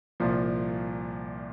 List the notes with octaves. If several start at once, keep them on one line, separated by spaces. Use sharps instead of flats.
C2 A#2 F3